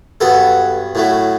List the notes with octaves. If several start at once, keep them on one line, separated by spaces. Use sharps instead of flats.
G2 F#3 B3 A4
A2 F#3 A3